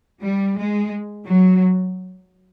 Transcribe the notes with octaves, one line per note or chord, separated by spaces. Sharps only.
G3
G#3
F#3